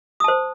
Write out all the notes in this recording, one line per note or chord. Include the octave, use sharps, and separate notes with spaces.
C5 A5 D#6